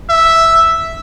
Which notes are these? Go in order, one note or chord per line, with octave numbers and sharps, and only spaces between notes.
E5